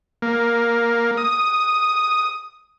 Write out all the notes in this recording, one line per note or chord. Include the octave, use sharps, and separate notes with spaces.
A#3
D#6